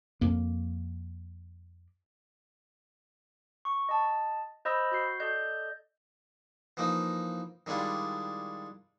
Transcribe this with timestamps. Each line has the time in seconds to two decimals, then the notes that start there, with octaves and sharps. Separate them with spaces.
0.21 F2 A#3
3.65 C#6
3.89 D#5 A5
4.65 C5 D#5 B5 E6 G6 A#6
4.92 F#4 G6 C7
5.20 A4 D5 D#5 G6
6.77 E3 F3 A#3 D#4
7.66 D#3 G3 G#3 D4 E4 F4